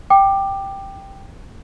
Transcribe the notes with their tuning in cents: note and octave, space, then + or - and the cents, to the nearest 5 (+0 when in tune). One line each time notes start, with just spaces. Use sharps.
G5 +0 D6 +20